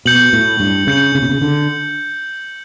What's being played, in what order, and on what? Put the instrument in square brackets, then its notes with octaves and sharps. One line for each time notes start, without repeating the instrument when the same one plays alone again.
[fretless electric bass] B2 [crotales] G6 C#7 F#7
[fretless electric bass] A2
G2
[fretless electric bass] C#3 [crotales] G6 C#7 F#7
[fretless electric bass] C#3
B2
C#3
D3